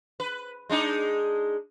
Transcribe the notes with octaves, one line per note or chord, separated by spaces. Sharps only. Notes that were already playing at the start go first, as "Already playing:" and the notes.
B4
G#3 D4 D#4